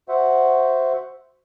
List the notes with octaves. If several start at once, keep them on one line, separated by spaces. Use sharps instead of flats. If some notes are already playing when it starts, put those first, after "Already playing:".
F#4 C5 E5 F#5